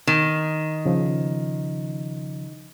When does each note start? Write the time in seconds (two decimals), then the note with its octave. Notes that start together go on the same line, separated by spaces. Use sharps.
0.07 D#3
0.86 C#3 F3